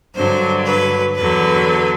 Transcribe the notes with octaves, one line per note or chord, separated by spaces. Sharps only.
G2 D3 F#3 C5
B4
E2 D3 F#3 B4